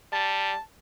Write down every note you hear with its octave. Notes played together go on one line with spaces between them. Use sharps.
G3 A5